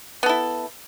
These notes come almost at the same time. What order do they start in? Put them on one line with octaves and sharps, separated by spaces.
B3 A4 E4